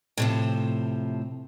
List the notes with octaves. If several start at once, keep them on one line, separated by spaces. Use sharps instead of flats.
A2 C3 F3